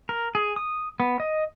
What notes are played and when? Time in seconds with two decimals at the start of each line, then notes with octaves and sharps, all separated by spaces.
0.09 A#4
0.35 G#4
0.56 D#6
1.00 B3
1.20 D#5